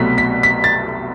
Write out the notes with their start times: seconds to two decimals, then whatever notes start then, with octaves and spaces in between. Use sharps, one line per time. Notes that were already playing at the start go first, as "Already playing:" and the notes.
Already playing: C2 B2 F#3 A3 B6
0.18 B6
0.43 B6
0.64 A6